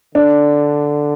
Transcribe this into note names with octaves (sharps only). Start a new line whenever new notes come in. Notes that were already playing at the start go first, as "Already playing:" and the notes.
D3 D4